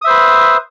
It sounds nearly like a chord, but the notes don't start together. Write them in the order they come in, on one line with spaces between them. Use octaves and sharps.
D#6 E5 C5 B4